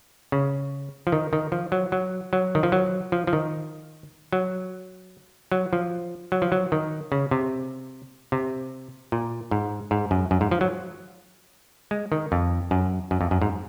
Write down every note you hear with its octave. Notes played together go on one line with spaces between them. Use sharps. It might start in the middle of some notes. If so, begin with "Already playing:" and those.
C#3
F3
D#3
D#3
F3
F#3
F#3
F#3
D#3
F3
F#3
F3
F3
D#3
F#3
F#3
F3
F#3
F3
F#3
D#3
C#3
C3
C3
A#2
G#2
G#2
F#2
F#2
G#2
F3
F#3
G#3
D#3
F2
F#2
F#2
F2
F#2
G#2